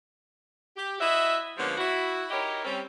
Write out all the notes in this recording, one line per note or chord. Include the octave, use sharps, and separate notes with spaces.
G4
E4 F#4 C#5 D#5 E5
D3 F3 G#3 A#3 B3 C#4
E4 F#4
D#4 E4 G4 A#4 C#5 D#5
G3 C4 C#4